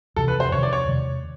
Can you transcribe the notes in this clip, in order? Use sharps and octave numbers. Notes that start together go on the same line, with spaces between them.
F2 C3 E3 A4
B4
C5
F2 C3 D#3 C#5
D5
C#5
E2 C3 D#3 G#3